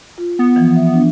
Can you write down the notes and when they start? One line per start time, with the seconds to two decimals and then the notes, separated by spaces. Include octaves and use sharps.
0.18 F4
0.39 B3
0.56 E3 F3
0.76 E5
0.94 D4